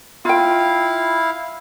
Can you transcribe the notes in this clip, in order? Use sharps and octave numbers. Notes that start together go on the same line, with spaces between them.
E4 F4 F5 G5